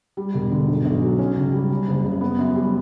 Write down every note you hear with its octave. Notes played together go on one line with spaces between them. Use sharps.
G3
E1
D3
B1
B1
F#3
C#4
C#2
G3
G3
F#1
C#3
B3
F#2
G3